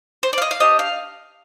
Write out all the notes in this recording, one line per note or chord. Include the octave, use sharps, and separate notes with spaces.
C5
D5
F5
D#5
F5
D4 G4 D#5
F5